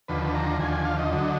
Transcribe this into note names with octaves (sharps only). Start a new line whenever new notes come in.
D#2 D3 F3 B4
A#5
D#2 D3 F3 G#5
G#5
F5
D#5
D2 D3 F#3